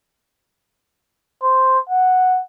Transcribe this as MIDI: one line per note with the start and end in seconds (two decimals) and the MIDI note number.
1.43 1.78 72
1.89 2.41 78